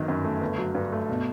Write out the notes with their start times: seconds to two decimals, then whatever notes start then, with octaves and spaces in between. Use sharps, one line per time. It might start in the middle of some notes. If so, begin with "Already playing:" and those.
Already playing: G1 D#3 F#3
0.08 F#2
0.25 A3
0.41 G1
0.58 F#3
0.75 G2
0.92 A3
1.09 B2